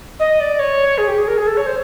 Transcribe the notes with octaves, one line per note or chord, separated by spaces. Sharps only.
D#5
D5
C#5
G#4
G4
G#4
A#4
G#4
A4
C#5
C5